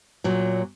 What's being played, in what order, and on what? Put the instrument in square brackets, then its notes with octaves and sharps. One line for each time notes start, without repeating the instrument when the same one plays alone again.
[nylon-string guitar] A#2 F#3